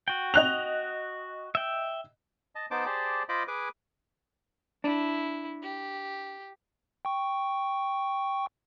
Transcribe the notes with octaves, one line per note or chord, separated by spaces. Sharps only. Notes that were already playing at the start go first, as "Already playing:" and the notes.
F#4 G5
D#5 F#6 F7
E5 G5
D#5 A5
B3 D#4 C5 A5 D6
G4 G#4 C5 D5 A5
F4 C5 D#5 B5 D6
G#4 B4 G#5 D6
D4 E4
G4
G5 C#6